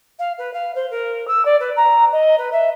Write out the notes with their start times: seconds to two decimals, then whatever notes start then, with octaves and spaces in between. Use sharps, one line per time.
0.18 F5
0.38 B4
0.53 F5
0.75 C5
0.90 A#4
1.27 E6
1.45 D5
1.59 B4
1.76 A#5
2.12 D#5
2.37 B4
2.52 E5